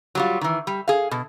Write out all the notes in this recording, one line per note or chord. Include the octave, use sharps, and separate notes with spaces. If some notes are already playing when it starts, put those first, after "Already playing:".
F#3 G3 F4
D#3 E3
G3
G#4 F5
B2